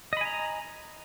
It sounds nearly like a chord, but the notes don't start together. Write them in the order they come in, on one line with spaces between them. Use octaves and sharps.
D#5 B5 G#5 A#5